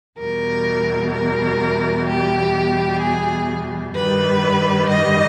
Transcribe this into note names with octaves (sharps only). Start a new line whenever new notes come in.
E2 B2 G3 A#4
A#4
G4
G#4
G2 D#3 G3 B4
D#5